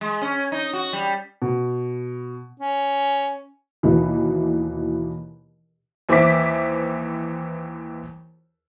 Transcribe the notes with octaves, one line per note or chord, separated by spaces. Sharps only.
G#3
C#4
D#4
F#4
G3
B2
C#4
D#2 B2 E3
D#2 E3 C5 E5 D6 B6